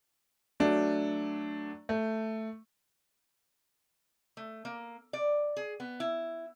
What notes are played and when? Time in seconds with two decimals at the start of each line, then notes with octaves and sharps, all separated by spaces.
0.60 F#3 A3 D4
1.89 A3
4.37 A3
4.65 A#3
5.13 D5
5.57 G#4
5.80 B3
6.00 E4